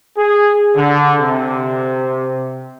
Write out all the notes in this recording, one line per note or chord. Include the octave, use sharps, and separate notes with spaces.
G#4
D3
C3